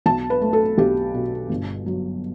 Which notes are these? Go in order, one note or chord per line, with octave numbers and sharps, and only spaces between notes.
B1 A5
B4
A3
A4
B1 G4
B2
G1
F#3